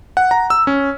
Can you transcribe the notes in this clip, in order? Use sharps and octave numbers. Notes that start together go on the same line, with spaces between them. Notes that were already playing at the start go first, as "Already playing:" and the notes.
F#5
A#5
E6
C#4